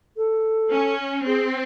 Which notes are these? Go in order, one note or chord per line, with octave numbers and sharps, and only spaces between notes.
A4
C#4
C4 G#4